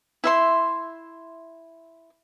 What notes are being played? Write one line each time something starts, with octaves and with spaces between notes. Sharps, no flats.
E4 E5 C6